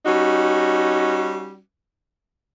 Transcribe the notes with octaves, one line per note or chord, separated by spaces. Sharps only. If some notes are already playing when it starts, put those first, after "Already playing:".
G3 C#4 D#4 F#4